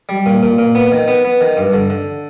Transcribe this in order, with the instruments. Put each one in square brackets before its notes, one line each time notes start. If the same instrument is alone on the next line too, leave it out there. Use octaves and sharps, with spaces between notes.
[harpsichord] G3
A#2
A#2
A#2
B3
D#3
B3
B3
D#3
G2
D3
D3